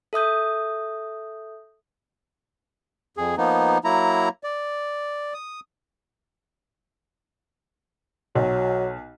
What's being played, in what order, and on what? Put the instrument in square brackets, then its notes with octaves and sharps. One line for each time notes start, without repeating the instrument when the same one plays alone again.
[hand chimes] A4 E5 D#6 G6
[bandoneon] F2 G#4
F3 A#3 B3 D#4
F#3 A#3 E4 A#5
D5
D#6
[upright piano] B1 [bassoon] F#3